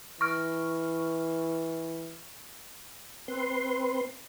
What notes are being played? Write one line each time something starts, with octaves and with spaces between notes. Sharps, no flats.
E3 C#6 F6
C4 B4 C6